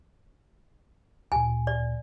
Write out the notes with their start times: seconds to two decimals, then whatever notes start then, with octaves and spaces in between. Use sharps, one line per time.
1.32 D2 A#2 G#5
1.67 D5